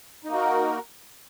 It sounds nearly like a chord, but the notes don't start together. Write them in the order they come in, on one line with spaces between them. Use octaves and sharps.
D#4 A#3 F#4 A#4